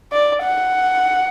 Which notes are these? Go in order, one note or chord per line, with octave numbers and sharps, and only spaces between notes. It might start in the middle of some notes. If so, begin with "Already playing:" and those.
D5
F#5